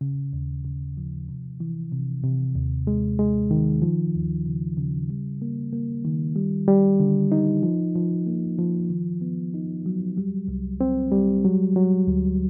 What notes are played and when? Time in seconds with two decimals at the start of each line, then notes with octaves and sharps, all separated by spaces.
0.01 C#3
0.33 D#2
0.65 C#3
0.97 F3
1.28 C3
1.60 E3
1.92 C3
2.23 C3
2.56 D#2
2.87 G#3
3.19 G#3
3.51 D#3
3.82 F3
4.14 D#2
4.45 C#3
4.77 C#3
5.10 G3
5.42 A#3
5.73 A#3
6.05 D#3
6.36 G3
6.68 G3
7.00 D3
7.32 D#4
7.63 F3
7.95 F3
8.26 A#3
8.59 F3
8.90 D#3
9.21 B3
9.54 D#4
9.86 F#3
10.17 G3
10.48 C2
10.81 C4
11.12 G3
11.45 F#3
11.76 F#3
12.07 D2